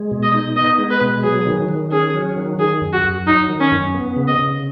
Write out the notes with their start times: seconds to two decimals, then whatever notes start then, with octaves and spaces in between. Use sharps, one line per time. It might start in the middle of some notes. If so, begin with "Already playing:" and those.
Already playing: G#3
0.11 B2
0.23 D#5
0.34 D#4
0.56 B3 D#5
0.78 G#3
0.90 B4
1.01 B2
1.23 F#3 G#4
1.46 D#3
1.69 D#3
1.91 C#4 G#4
2.14 F#3
2.36 D#3
2.59 D#3 G#4
2.81 F#2
2.92 F#4
3.04 F#2
3.26 F#3 D#4
3.49 D#3
3.60 C#4
3.71 F#2
3.95 B3
4.16 C#3
4.28 D#5
4.39 C#3